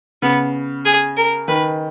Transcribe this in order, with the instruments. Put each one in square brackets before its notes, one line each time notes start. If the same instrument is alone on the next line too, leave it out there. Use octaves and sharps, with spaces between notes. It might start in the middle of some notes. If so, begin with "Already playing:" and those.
[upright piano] C#3 [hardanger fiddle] B3
[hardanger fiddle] G#4
A#4
[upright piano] D#3 [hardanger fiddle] B4